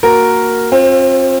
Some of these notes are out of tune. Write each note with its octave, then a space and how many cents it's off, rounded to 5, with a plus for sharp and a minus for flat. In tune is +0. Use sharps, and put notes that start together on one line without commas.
A#3 -5 F#4 +0 A#4 +0
C4 +35 F4 +25 C5 +0